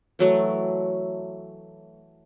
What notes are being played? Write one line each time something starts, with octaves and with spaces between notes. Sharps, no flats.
E3 F#3 A3